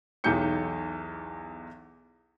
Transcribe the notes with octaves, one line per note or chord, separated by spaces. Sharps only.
B1 E2 D#4 G4 G6 C#7